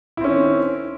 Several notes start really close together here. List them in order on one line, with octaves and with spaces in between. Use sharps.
E4 C4 C#4 D#3